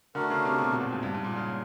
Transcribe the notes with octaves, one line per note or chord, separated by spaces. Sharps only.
D3 A3 D4 F#4 A#4
C#3
C3
B2
A#2
A2
G#2
G2
G#2
A#2
C#3